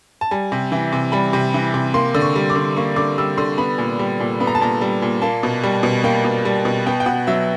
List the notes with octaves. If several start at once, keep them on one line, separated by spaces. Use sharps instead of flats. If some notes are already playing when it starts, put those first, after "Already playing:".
A5
G3 G#5
C3
E3
C3
G3 B5
C3
E3
C3
A#3 C6
D3
C#6
G3
D6
D3
A#3 C#6
D3 D6
G3 E6
D3 C6
B3 B5
A#2
G3
A#2
B3 B5
A#5
A5
A#2 A#5
G3
A#2
A#3 A5
B2
G3
B2
A#3 G5
B2
G3
B2
B3 G5
G5
B2 F#5
F#3 E5